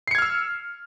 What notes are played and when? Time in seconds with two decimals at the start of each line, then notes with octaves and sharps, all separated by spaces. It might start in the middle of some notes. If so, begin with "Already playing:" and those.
0.08 C7
0.11 C#7
0.15 G#6
0.18 F6
0.22 E6